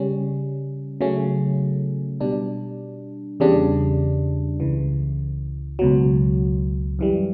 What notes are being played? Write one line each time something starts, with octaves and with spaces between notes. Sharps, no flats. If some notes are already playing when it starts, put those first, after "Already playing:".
Already playing: C#3 G3 C#4
C#3 F#3 A3 C#4
B2 G3 D4
E2 C#3 G3 D4
C#2 C#3 E3
C#2 B2 F#3
F#2 E3 G3